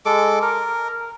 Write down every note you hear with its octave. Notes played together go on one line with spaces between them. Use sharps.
G#3 A4 D6
A#4